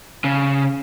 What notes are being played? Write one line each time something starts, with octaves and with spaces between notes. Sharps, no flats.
C#3